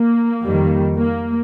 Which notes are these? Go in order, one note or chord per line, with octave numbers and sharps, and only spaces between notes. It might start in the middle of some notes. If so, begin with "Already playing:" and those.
Already playing: A#3
F2 D#3 G3
A#3